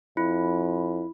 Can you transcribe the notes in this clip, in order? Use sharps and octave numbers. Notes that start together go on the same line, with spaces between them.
F2 E4